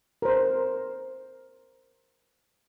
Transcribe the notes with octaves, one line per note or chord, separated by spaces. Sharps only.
A#4 C5